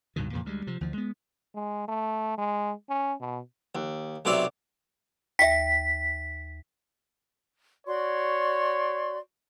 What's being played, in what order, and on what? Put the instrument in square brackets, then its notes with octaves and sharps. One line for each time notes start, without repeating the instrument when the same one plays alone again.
[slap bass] C#2 G2 B2 D#3
F2 A#2 C#3 E3
D2 G3 G#3
C3 F3
D2 E3 F3
G#3 B3
[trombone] G#3
A3
G#3
C#4
B2
[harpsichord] D#2
B1 C3 F#3 D5 E5
[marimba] D#2 [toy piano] E5 G5 [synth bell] B6
[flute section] F#4 D5 C6 [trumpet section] C#5